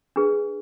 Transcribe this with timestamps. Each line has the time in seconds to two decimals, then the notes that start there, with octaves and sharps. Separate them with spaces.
0.16 D4 G#4 B4